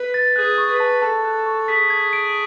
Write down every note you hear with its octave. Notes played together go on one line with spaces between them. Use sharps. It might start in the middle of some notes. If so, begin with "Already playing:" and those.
Already playing: B4
A6
G#4 F#6
C#6
B4
A5
A4 A5
F#6
C#6
G#4 B6
G#6
D7